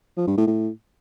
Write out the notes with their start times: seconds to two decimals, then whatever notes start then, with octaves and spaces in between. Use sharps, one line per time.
0.17 F3
0.27 G2
0.37 A2
0.47 A2